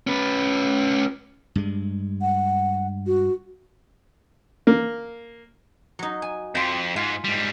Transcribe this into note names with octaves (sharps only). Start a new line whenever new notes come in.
C#4 B4
G2 G#3
F#5
F#4
A#3
F#3 D#4
G#5
F2 G5 C6
G#2 F4 G#5
G#2 G3